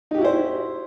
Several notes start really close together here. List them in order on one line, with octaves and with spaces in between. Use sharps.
D#4 G4 F#4 E4 C5